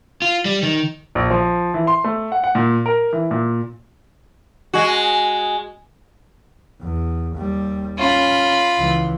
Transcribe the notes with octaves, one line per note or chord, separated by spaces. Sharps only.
F4
G3
D#3
A#1
F3
E3
C6
A3
F#5
F#5
A#2
A#4
E3
A#2
G#3 F#4
E2
D#2 G3
C#4 F4 B5
C#2 E3